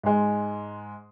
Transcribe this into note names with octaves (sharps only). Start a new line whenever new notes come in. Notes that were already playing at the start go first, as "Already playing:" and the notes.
G#2 G#3